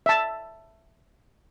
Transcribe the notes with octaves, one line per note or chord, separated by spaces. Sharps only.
E5 A5